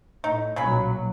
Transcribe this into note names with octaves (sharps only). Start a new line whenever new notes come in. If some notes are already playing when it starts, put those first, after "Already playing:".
A2 D#4
B1 A#2 C#3 F#3 B5